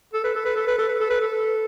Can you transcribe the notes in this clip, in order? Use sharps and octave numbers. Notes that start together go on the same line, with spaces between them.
A4
B4
A4
B4
A4
B4
A4
B4
A4
B4
A4